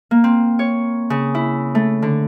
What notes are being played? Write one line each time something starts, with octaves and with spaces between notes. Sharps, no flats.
A#3
C4
C#5
C#3
E4
A3
D3